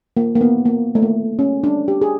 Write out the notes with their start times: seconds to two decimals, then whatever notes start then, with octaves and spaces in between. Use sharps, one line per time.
0.17 A#3
0.35 A#3
0.41 B3
0.65 A#3
0.95 A3
1.02 A#3
1.39 C#4
1.64 D4
1.88 G4
2.01 G#4